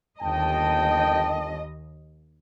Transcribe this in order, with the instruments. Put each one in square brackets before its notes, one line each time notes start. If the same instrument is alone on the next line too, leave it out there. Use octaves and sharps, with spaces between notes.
[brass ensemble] G1 G5 A5 [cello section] D#2 D#5